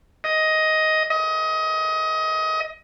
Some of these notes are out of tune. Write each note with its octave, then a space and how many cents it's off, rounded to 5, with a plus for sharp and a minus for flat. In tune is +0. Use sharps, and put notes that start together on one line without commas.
D#5 +10
D#5 +25